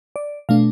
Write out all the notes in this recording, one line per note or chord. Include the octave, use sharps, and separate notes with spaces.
D5
B2 A3 D4 F5